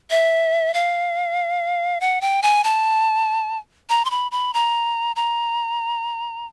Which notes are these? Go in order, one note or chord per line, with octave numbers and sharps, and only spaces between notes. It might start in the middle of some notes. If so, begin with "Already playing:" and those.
E5
F5
F#5
G5
G#5
A5
A#5
C6
B5
B5
A#5
A#5